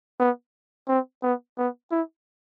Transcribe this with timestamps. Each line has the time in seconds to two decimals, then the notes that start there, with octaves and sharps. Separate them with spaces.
0.20 B3
0.88 C4
1.23 B3
1.58 B3
1.91 E4